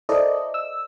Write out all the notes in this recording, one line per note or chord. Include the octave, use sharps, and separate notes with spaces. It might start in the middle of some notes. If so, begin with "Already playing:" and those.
E4 A4 A#4 C5 D5 D#5
E6